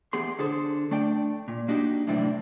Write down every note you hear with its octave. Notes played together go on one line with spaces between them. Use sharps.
E2 B3 G4 G#4 C6
D3 G#4 A4 C5
A3 D4 D5 G5
A#2
A#3 D4 D#4 F#4 G4
F#2 A2 C3 E3 C4 D4